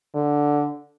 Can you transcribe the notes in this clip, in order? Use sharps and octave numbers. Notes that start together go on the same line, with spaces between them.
D3